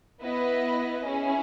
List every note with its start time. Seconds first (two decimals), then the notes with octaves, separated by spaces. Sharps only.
0.22 B3 E4 B4 D#5
1.05 C#4 E4 G#4